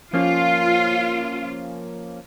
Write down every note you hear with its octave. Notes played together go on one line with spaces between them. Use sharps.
F3 A#3 C#4 F4